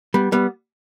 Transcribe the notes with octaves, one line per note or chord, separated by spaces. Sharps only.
G3 B3
G3 B3